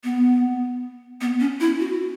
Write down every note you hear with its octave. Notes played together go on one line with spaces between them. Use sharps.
B3
B3
C#4
E4
F#4